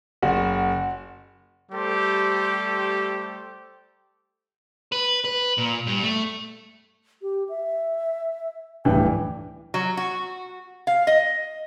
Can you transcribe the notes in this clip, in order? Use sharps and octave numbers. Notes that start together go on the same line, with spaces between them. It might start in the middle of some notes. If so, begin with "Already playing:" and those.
F#1 F#4
G3 A3 G4 A4 C5
B4
B4
A#2
G2
A3
G4
E5
D1 G2 E3 G5
F#3
F#4
F5
D#5